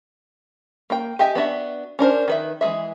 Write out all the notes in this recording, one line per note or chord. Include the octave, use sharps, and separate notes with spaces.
A#3 A#4 G5
G4 D#5 E5 G5 G#5
B3 D4 F#4 E5
C#4 D4 A#4 C5
D#3 B4 E5
E3 G#3 G#4 E5